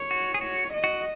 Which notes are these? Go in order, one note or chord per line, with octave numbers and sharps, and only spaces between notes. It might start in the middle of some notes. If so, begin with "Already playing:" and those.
Already playing: C#5
F#4
G#4
F#4 C#5
D#5
F#4